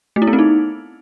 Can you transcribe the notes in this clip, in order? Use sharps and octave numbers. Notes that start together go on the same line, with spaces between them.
A3
E4
B3
C4
D#4